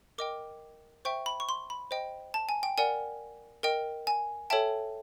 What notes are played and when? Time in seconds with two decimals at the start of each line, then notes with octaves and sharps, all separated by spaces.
0.18 A#4 D#5 G5 D6
1.05 C5 E5 G5 C#6
1.26 B5
1.40 C#6
1.49 C6
1.70 B5
1.91 C5 D#5 G5
2.34 A5
2.49 G#5
2.63 G5
2.78 A#4 D5 F#5 G#5
3.63 A#4 D#5 G5
4.07 G#5
4.50 A4 C#5 E5 G5 A5